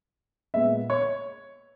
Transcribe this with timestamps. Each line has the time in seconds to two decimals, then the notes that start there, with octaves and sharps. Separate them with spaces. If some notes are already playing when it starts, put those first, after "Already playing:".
0.54 A#2 G#3 B3 E5
0.90 C#5